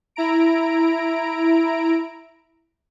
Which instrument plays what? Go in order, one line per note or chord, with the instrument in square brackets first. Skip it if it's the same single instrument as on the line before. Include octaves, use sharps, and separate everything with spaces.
[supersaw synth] E4 A#5 D7